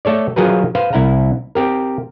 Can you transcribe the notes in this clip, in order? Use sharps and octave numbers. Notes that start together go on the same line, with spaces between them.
A3 A4 C#5 D5
F3 F#3 F#4 G#4 A#4 B4
B4 C5 F5
C2 E4 F#5 A#5
C4 G4 A#4